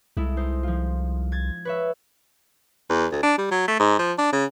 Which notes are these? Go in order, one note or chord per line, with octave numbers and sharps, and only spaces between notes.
C2 G#3 E4 A4
D#4 C5
F3 F4
G#6 A6
B4 C#5 E5
E2
D2
D4
G3
F#3
A3
G#2
F3
D4
C#3